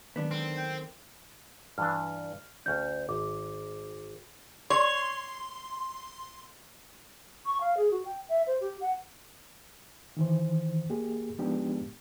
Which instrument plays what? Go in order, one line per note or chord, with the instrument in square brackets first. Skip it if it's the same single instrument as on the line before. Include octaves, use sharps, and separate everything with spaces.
[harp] D#3 F#3 G#3 [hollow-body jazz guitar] B3 D4
[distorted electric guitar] C4 [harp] A4
[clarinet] G5
[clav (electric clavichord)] G2 E3 D4 [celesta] F6
[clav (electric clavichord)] D2 C#4 [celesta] G6
[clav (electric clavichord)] G#1 [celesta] D6
[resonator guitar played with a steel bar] C#5 [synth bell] C6
[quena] C#6
F5
G#4
F#4
G5
E5
C5
G4
F#5
[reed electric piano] D#3 E3 C5
A#3 G4 G#4
F3 G#3 B3 D4 D#4 G4